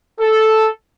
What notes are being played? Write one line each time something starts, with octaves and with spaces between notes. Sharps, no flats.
A4